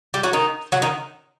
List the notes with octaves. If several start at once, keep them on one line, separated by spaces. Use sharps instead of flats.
G3 G4
F#3 F#4
D#3 D#4
F#3 F#4
D#3 D#4